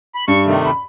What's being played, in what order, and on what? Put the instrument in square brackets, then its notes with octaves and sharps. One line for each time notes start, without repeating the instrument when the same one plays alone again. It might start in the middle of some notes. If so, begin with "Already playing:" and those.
[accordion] B5
[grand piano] G2 [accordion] C#6
[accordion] C3 D#3 A3
[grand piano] B5